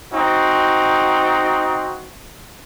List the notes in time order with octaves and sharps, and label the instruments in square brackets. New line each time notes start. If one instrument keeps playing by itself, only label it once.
[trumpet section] C4 D#4 F#4